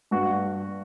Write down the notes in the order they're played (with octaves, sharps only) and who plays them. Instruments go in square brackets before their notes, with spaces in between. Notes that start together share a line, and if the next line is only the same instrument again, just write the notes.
[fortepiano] G2 F#4